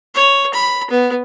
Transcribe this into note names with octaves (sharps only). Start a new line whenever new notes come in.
C#5
B5
B3